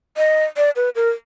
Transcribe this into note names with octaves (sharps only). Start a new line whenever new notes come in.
D#5
D5
B4
A#4